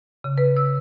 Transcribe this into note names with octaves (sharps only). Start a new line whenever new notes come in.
C#3
B4
E6